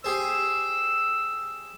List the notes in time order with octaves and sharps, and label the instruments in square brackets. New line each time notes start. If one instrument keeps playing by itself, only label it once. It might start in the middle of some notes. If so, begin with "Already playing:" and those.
[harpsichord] G4 G#4 C5 [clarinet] E6